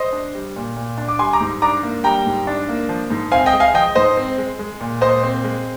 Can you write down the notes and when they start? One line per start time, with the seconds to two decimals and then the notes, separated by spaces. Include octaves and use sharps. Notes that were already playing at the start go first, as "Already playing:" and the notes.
Already playing: C5 D#5
0.13 D4
0.35 G3
0.56 A#2
0.77 A#2
0.98 D4
1.08 D6
1.19 G3 G#5 C6
1.33 A#5 D6
1.41 G#2
1.62 D4 A#5 D6
1.83 A#3
2.04 G3 G5 A#5
2.26 G#2
2.47 D4
2.69 A#3
2.89 F3
3.10 G#2
3.32 C4 F5 G#5
3.46 D#5 G5
3.53 G#3
3.60 F5 G#5
3.74 F3 D#5 G5
3.95 G#2 C5 D#5
4.17 C4
4.38 G#3
4.59 G#3
4.80 A#2
5.01 A#2 C5 D#5
5.23 C4
5.44 G#3